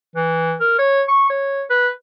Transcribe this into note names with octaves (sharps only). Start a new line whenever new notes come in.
E3
A#4
C#5
C#6
C#5
B4